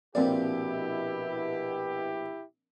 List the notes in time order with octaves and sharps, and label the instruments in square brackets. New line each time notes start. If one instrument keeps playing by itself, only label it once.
[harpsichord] A#1 A#3 [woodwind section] B2 [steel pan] C4 D5 [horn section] E4 G4